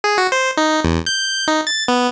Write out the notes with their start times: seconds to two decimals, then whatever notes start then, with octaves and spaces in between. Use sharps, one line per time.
0.04 G#4
0.18 F#4
0.32 C5
0.57 D#4
0.84 E2
1.06 G6
1.48 D#4
1.67 A6
1.88 B3